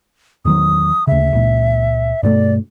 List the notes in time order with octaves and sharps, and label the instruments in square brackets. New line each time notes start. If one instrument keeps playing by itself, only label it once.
[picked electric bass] E2 D#3 F#3 [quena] D#6
[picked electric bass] D2 C#3 [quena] E5
[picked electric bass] C#2 A#2
[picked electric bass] G2 B2 A3 [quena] D5